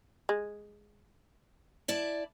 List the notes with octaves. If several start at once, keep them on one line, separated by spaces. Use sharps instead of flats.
G#3
E4 D5 A5